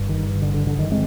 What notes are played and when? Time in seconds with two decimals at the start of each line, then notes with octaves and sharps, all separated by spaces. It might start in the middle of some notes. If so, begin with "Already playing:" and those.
Already playing: G1 G2
0.09 D#3
0.42 D3
0.54 D3
0.67 D3
0.79 D#3
0.92 G#3 C4